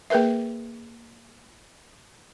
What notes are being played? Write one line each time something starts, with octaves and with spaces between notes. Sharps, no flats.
A#3 G#4 A#4 B4 E5